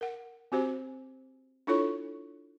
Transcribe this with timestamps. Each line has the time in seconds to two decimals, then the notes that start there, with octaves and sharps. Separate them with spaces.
0.01 A#4 F#5
0.52 C4 F#4 G4 C5
1.67 D4 E4 F4 A4 C#5 C#6